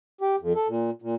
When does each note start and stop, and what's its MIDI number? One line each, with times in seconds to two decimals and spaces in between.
0.21 0.36 67
0.40 0.53 41
0.55 0.67 69
0.68 0.90 46
1.02 1.15 46